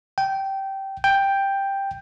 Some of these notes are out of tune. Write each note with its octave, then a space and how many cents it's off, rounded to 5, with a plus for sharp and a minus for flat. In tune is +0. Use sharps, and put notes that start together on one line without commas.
G5 -15
G5 +5